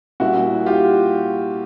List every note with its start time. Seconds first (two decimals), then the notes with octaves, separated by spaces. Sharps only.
0.20 A#2 G3 E4 F#4
0.66 F4 G4